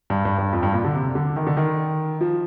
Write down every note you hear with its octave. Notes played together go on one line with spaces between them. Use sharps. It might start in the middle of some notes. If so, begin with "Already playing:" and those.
G2
G2
G2
F2
G2
A#2
D3
C3
D3
D#3
D3
D#3
F3